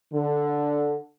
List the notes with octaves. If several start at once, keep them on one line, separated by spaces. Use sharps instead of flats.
D3